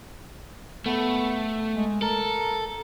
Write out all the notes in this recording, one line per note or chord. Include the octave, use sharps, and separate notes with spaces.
A3 B3
G#3
A4 A#4